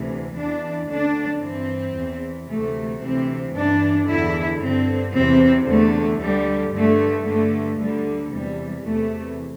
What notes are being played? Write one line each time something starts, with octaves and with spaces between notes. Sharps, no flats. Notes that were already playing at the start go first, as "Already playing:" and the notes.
Already playing: D2 C3 E3
E2 E3 D4
D2 D3 D4
G2 E3 C4
E2 E3
D2 C3 E3 A3
D2 C3 E3 C4
G2 E3 D4
E2 D3 E4
G2 D3 C4
E2 C3 E3 C4
E2 D3 A3
D2 D3 G3
G2 D3 A3
G2 D3 A3
D2 D3 G3
E2 C3 E3 G3
E2 C3 E3 A3